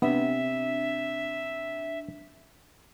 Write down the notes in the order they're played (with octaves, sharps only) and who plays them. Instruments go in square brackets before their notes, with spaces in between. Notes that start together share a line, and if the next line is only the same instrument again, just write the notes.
[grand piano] C3 [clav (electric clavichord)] B3 [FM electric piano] D4 [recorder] E5